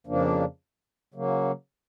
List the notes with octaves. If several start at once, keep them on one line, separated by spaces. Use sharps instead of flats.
F2 C#3 F3 A#3 D4
C#3 F#3 A#3